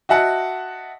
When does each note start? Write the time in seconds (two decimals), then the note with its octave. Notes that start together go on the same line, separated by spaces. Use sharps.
0.09 F#4 D#5 E5 F#5 A5